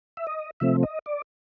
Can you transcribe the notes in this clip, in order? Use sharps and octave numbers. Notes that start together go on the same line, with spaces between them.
E5
D#5
C3 F3 A3 C4 E5
D#5
D5